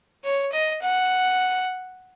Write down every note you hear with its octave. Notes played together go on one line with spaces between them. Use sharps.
C#5
D#5
F#5